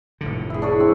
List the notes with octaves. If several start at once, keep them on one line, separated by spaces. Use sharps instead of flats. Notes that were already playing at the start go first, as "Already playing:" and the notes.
F1 A2 D3
E4 G#4
D4 G#4 C#5
C4